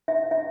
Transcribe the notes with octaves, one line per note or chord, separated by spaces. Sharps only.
E5
E5